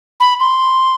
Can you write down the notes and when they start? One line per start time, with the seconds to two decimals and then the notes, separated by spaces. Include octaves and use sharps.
0.20 B5
0.40 C6